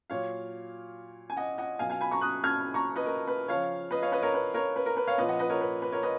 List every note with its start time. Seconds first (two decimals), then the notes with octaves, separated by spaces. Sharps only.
0.10 A#2 F#3 C#5 F5
1.30 G#5
1.37 D#5 F#5
1.58 D#5 F#5
1.79 B2 F#3 F5 G#5
1.90 F5 G#5
2.01 G#5 B5
2.11 A#5 C#6
2.21 D#6 F#6
2.44 F6 G#6
2.74 A#5 C#6
2.96 B4 D#5
3.06 A#4
3.27 B4
3.48 C#3 F3 C#5 F5
3.91 B4 D#5
4.02 C#5 F5
4.12 B4 D#5
4.22 A#4 C#5
4.34 B4
4.54 A#4 C#5
4.76 B4
4.86 A#4
4.97 B4
5.07 C#5 F5
5.18 A#2 F3 B4 D#5
5.29 D#5 F#5
5.39 B4 D#5
5.50 A#4 C#5
5.61 B4
5.82 B4
5.92 A#4 C#5
6.03 B4 D#5